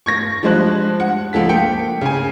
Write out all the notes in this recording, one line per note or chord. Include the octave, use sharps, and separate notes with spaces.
C#6 G#6 A#6
F3 G3 G#3 C5 A5 F#6
F#5
C#2 F3 A4 B6
A#3 G5 C#7
C#3 G#5